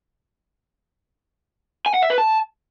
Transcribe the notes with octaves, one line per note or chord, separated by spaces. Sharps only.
G#5
F#5
E5
B4
A5